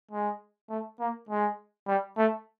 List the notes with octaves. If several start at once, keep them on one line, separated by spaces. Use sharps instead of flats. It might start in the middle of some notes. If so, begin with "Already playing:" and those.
G#3
A3
A#3
G#3
G3
A3